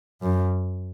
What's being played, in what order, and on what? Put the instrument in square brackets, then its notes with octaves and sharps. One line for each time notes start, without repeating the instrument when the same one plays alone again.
[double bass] F#2